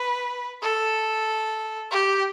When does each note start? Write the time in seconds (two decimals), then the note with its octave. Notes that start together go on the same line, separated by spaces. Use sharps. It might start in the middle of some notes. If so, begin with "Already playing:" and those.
Already playing: B4
0.62 A4
1.91 G4